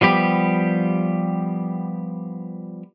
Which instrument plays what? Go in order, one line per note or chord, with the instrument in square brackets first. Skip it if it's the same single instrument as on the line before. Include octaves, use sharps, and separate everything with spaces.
[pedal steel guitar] F3 G3 B3 G4